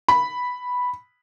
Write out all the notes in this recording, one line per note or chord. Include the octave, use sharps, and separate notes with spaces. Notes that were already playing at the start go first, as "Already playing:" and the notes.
B5